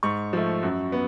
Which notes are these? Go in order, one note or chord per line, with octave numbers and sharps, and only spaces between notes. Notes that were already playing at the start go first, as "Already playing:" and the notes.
G#2 C#6
F3 A3
F#2
B3